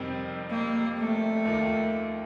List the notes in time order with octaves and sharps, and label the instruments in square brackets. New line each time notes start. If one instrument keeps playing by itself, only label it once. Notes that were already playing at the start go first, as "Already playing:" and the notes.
Already playing: [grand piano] F2 C3 D#3 G3 C4
[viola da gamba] A#3
A3
[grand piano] D#2 D#3 A#3 F4